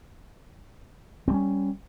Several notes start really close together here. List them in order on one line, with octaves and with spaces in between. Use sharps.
C4 G3 C#4